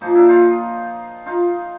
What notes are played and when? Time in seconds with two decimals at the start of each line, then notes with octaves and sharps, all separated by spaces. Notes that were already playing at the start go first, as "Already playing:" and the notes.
0.01 A#2 F3 A#3 D#4
0.15 D4 E4
0.28 D#4 F4
1.26 D#4 F4